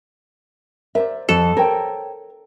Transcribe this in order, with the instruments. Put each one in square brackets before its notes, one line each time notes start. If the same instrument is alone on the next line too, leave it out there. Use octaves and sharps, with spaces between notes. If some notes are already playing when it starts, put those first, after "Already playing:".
[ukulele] A#4 C5 D5 [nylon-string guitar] E5
[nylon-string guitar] F2 [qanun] A4
[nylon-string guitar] A#4 [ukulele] C5 C#5 G5